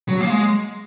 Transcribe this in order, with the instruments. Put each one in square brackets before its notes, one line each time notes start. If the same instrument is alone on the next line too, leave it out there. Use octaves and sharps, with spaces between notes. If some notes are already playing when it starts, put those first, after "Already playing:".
[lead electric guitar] F#3
A#3
G#3